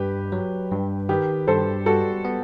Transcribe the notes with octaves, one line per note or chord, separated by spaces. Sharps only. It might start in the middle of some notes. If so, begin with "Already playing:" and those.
Already playing: G2 G4 B4
F#3
G2
D#3 G4 B4
G2 A4 C5
G3 F#4 A4
B3